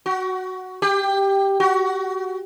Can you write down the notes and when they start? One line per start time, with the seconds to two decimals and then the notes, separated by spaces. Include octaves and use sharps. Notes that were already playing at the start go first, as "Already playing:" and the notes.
0.06 F#4
0.82 G4
1.60 F#4